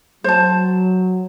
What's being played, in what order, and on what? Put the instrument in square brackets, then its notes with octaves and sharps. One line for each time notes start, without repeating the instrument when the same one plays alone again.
[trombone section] F#3 [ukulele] C5 A5